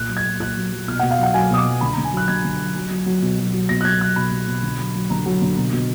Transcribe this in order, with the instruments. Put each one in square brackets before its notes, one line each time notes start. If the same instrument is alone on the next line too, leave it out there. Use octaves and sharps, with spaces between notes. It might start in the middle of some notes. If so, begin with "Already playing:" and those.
Already playing: [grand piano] A#2 F#6
F#3
G#6
A#2
A#2 F#6
F#3
F#3
B2 F6
F#5
B2
F5
F#3 F#5
F#3 G#5
B2 D#6
D6
F#3
D3 B5
A#5
D3
G#5
F#3 F#6
D3 G#6
D3
F#3
F#3
F#3
F#3
B2
F#3
F#3
B2 A#6
F#6
F#3 G#6
F#3 F#6
B2 B5
B2
B2
D3
F#3
F#3
D3 A#5
F#3
D3
B2
B2